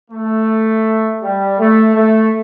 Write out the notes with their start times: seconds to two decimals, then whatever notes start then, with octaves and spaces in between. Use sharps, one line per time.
0.11 A3
1.22 G3
1.59 A3
1.95 A3